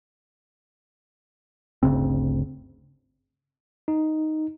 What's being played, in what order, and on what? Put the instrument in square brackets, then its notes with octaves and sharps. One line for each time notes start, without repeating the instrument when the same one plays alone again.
[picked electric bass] G1 D2 C#3 C4
[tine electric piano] D#4